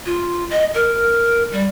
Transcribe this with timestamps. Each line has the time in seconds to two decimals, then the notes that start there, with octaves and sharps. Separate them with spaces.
0.06 F4
0.50 D#5
0.74 A#4
1.52 G3